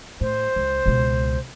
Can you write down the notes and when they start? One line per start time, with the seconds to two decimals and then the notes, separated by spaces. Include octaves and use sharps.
0.21 A2 C5
0.56 C#2
0.86 C#2 B2